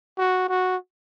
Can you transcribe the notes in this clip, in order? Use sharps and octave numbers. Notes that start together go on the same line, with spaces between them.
F#4
F#4